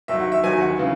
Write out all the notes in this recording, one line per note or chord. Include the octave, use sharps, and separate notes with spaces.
D#2 D#3 F#3 E5
F#5
E5
D#2 D#3 F#3 G#5
F#5
C#3 E3